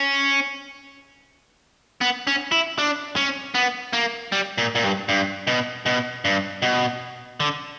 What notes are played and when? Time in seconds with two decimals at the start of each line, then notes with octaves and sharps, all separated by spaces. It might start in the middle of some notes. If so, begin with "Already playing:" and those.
Already playing: C#4
2.01 B3
2.27 C#4
2.52 E4
2.78 D4
3.16 C#4
3.55 B3
3.93 A#3
4.32 G3
4.58 A#2
4.75 A#2
4.84 G2
5.09 G2
5.47 B2
5.86 B2
6.25 G2
6.62 B2
7.40 D3